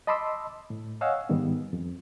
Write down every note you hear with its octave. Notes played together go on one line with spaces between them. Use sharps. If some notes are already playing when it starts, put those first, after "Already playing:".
D#5 A5 B5 C6 D6 E6
A2
C#5 D#5 F5 F#5 G#5 E6
G#2 D#3 G3 B3
F2